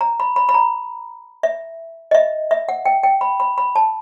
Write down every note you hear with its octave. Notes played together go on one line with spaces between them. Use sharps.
A#5
B5
B5
B5
A#5
E5
D#5
E5
E5
F#5
G5
G5
B5
B5
B5
A5